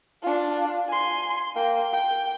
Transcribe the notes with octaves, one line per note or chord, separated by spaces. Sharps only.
D4 F4
G#5 C6
A#3 G5
G5